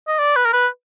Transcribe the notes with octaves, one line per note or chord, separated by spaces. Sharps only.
D#5
D5
B4
A#4
B4